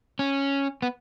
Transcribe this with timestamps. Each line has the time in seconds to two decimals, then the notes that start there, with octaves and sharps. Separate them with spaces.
0.19 C#4
0.82 B3